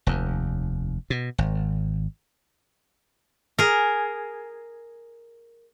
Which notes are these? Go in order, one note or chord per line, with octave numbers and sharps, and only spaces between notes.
F1 D#2
B2
G#1
G#4 A#4